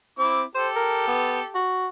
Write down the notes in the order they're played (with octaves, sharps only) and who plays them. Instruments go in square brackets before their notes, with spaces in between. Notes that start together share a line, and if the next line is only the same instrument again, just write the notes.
[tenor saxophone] C4 [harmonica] E4 D6
[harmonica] G4 A4 [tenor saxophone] C5
[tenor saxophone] A#4
B3
F#4